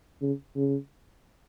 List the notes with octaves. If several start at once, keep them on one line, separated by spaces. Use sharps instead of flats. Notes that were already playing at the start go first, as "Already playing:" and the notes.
C#3
C#3